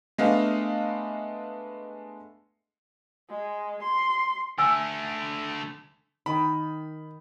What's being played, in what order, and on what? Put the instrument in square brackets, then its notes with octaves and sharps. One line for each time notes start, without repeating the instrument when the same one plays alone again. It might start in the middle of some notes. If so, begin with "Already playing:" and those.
[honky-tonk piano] G#3 A3 B3 D4 D#5 F5
[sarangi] G#3
C6
[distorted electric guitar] D3 A3 [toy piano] G#5 E6
[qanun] D#3 [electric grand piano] B5